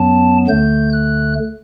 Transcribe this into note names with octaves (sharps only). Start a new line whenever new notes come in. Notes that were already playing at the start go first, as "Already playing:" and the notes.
Already playing: F#2 F#3 B3 A5
D2 D3 A3 G6
F#6